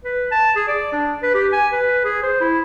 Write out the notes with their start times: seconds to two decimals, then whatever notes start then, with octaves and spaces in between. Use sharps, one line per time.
0.04 B4
0.31 A5
0.56 G#4
0.68 D5
0.92 D4
1.22 B4
1.34 G4
1.52 G#5
1.72 B4
2.04 G#4
2.23 C5
2.41 E4